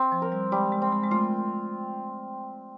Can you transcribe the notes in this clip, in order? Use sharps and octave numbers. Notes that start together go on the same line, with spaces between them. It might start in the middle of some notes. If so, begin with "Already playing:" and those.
Already playing: C4
F3
A#4
G3
G3 G#3
G#3
C4
G#3
G#3
A3 F4